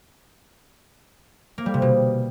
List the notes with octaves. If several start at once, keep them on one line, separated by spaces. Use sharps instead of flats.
A#3
G3
C3
B2